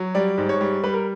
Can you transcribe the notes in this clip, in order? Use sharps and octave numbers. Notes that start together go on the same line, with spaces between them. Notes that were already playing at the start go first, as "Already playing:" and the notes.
Already playing: F#3
G3 D5
G#2
C#5
G3
G3 B4
A#4